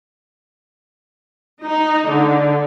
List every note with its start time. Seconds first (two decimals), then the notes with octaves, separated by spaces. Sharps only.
1.64 D#4
2.09 D3